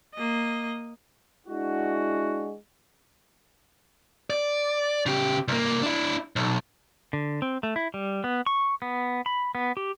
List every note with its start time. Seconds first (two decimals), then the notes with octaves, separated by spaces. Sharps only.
0.14 A#3 D#5
1.47 G#3 D4 E4 F#4
4.30 D5
5.06 C#3 G4
5.48 C2 A#3
5.83 D4 E4
6.36 B1
7.13 D3
7.42 C4
7.63 A3
7.76 E4
7.94 G3
8.24 B3
8.46 C#6
8.82 B3
9.26 B5
9.55 B3
9.77 G4